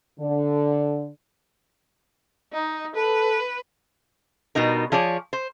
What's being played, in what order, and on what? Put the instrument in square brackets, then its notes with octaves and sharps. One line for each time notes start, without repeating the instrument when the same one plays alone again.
[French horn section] D3
[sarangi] D#4
[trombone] A4 [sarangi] B4
[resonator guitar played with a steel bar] B2 G3 D#4 A#4
F3 G#4 C#5 D5
C5